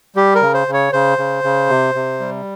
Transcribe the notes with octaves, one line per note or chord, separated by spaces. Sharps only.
G3 G4
A#4
C#3
C5
C#3
C#5
C#3 C5
C#3
C#3
C3
C3
G3